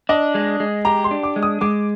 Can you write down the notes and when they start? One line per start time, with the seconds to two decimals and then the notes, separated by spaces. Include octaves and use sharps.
0.09 D4 D#5
0.35 G#3
0.60 G#3
0.85 G4 A#5
1.04 C6
1.11 D4
1.23 D6
1.36 G#3
1.43 D#6
1.61 G#3 D6